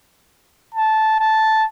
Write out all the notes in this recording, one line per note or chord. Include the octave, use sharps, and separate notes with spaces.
A5
A5